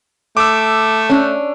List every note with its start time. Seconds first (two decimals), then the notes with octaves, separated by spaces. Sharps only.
0.37 A3 D6 E6
1.09 C#4 D4